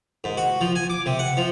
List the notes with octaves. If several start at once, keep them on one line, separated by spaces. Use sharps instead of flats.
G#2
F#4
F3
G#5
D6
C3
F#5
F3